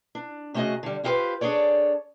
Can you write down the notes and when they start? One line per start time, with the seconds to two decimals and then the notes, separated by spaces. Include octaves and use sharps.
0.15 D4
0.54 C3 A3 C#4 F#4 G#4 D#5
0.83 D3 G3
1.04 E4 F4 G4 G#4 B4 C5
1.41 D4 G#4 A4 C#5 D5